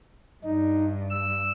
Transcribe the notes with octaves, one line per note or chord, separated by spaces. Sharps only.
G2 D#4
E6